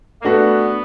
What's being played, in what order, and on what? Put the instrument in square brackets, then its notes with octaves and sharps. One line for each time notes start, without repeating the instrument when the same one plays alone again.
[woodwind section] A#3
[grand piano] A3 D4 F#4 B4 [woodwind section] B3